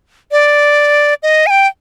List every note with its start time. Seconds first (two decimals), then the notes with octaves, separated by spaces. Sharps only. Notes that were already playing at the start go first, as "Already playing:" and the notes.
0.32 D5
1.23 D#5
1.47 G#5
1.50 G5